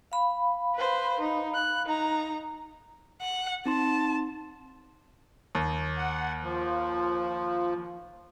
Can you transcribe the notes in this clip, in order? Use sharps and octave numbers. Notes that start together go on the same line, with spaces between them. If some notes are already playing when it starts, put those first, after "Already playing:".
F5 B5
B4 C5
D#4
F#6
D#4 A#5
F#5
C4 D#4 A5 C6
D#2
F#5
F3